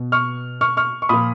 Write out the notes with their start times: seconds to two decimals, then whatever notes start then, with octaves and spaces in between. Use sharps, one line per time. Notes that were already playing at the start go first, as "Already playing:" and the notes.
Already playing: B2
0.12 C#6 F6
0.61 C#6 F6
0.77 C#6 F6
1.02 C#6
1.09 A#2 F3 B5 D#6